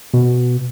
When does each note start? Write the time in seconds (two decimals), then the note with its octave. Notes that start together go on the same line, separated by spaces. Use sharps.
0.14 B2